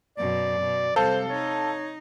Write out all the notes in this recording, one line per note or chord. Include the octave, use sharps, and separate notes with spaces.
F#2 B2 D5
B2
C3 G3 A4 C5 F5
D#4 C#5